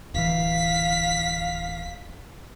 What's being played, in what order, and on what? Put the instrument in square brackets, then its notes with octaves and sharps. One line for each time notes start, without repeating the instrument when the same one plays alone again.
[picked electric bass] D1 E3 [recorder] F5 [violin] B6